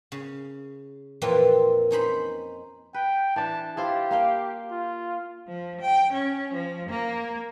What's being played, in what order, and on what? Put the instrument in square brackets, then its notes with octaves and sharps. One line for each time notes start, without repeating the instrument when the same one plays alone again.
[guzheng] C#3
F2 A#2 E3 C4 F4 B4
C#4 D#4 C5 B5
[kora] B4 [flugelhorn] G5
[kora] E3 D4 [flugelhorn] A5
[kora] E4 F4 C5 [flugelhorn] G4
[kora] A#3 F5 G5
[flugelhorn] F4
[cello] F3
G5
C#4
F3
A#3